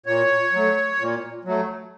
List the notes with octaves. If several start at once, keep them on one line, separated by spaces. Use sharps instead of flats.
A#2 C#5
F#3 A3
A#2
F#3 A3